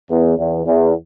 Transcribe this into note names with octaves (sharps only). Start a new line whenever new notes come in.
E2
E2
E2